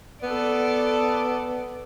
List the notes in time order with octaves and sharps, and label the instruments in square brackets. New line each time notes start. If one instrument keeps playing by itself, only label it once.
[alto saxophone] B3 [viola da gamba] A4 D5